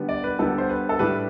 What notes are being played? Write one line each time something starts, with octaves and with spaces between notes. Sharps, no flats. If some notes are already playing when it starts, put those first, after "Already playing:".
Already playing: D3 G3 B3
D5
B4
D3 G3 B3 A4
C5
B4
A4
A2 G3 D4 B4